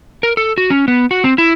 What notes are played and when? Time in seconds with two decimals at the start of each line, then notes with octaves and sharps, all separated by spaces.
0.23 A#4
0.37 A4
0.58 F#4
0.70 C#4
0.88 B3
1.11 F#4
1.24 C4
1.38 E4